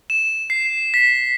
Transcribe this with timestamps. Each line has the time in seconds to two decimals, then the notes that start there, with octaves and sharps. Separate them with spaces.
0.10 E7
0.50 C7
0.94 B6